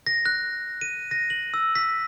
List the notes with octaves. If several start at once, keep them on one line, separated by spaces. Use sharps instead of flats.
A#6
F#6
D#7
A#6
F#7
E6
B6